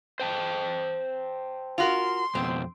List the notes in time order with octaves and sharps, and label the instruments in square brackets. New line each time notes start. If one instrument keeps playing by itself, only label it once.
[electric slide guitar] C5 G5 A5
[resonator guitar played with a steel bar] F4 F#4 A#4 [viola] C6
[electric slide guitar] F2 B2 [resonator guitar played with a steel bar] C4